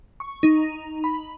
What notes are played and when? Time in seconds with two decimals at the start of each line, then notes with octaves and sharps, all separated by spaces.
0.20 C#6
0.43 D#4
1.04 B5